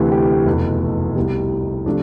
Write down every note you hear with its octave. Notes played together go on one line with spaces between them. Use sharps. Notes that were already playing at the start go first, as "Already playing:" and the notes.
Already playing: D2 C3 E3 B4
G4
F1 E2 B2 B4
A4
C2 B2 G3
C3 F3 A3 D4